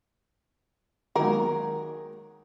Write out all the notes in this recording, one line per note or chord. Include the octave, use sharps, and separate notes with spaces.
D#3 F#3 G#3 A#3 A#4